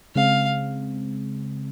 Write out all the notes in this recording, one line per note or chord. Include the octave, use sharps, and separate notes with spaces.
C#3 G#3 C4 F5